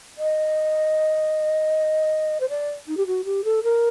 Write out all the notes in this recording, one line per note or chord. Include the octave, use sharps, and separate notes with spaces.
D#5
C5
D5
D#4
G4
F#4
G4
A4
A#4